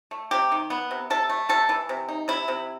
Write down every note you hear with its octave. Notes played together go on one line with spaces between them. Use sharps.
A3
C3 G4
D#3
B3
C3
C3 A4
A3
C3 A4
E3
C3
D#4
C3 E4
C3